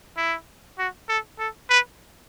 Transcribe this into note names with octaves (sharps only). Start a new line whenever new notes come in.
E4
F#4
A4
A4
B4